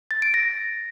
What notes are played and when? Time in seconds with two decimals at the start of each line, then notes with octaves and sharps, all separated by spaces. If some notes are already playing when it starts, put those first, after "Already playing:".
0.11 A6
0.22 D7
0.34 A#6